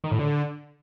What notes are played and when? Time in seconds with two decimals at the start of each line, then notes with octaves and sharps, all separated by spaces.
0.04 D#3
0.11 A2
0.19 D3